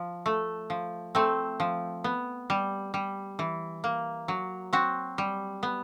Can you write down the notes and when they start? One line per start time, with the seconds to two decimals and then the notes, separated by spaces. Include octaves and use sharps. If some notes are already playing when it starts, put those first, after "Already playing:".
Already playing: F3
0.26 A3
0.70 F3
1.15 A3 C4
1.60 F3
2.04 B3
2.50 G3
2.94 G3
3.39 E3
3.84 A#3
4.28 F#3
4.73 C4 F#4
5.18 G3
5.63 B3